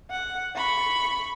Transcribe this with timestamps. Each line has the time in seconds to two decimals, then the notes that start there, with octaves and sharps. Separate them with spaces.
0.10 F#5
0.56 B5 C#6